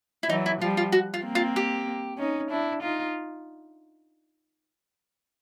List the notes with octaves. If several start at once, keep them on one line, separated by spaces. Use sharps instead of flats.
E4
E3 F#3 D#4
E4
F3 G3 F4
F4
F#4
F4
A#3 C4
F4
G4
C#4 D#4
D4 E4
D#4 F4